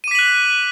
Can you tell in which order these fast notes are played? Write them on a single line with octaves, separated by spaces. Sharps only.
D#7 D6 B6 F#7 F#6